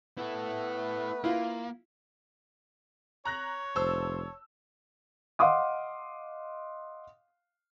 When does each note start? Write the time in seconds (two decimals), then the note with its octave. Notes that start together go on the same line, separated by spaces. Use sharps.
0.18 A3 B3 E4 A4 B4
1.24 A#3 E4 F4
3.25 C#5 A#5 F#6 A#6
3.76 F1 C5 A5 E6
5.39 D#5 F5 F#5 C6 D6 D#6